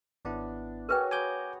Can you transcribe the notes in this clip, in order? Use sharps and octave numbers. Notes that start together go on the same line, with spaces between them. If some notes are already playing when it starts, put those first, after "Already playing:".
G#1 B3 D4 E4
F#4 G#4 A#4 B4 C#5 G5
B3 G#5 A#5 D6 G6